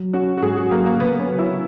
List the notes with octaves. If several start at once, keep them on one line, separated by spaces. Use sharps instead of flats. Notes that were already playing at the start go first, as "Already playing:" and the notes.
Already playing: F#3
C#4 F#4
F#4
G#2 G#4
F#4
F#3 A#3
A#3
C#3 B3
C#4
F#3
E4